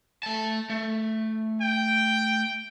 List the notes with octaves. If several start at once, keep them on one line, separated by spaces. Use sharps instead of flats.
A3 A5
A3
G5